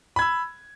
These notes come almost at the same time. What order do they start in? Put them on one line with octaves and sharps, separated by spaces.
B5 G#6 E6